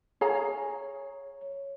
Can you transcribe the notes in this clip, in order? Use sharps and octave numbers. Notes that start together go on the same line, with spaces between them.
G#4 C#5 F5 A#5